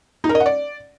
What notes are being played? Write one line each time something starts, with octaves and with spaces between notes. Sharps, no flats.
D#4
A#4
D#5
F#5
D5